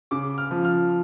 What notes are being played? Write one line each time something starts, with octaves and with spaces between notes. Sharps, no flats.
C#3 D6
F6
F3
F6